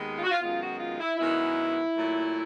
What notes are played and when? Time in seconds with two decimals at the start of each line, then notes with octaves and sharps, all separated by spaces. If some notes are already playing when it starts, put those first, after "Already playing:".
Already playing: D#2 D#3 G#3 B3
0.17 F4
0.24 F#4
0.31 F4
0.41 F#2 D#3 G#3 B3 F4
0.60 F#4
0.79 F4
1.00 E4
1.18 F#2 D#3 G#3 B3 E4
1.95 A#2 F#3 A3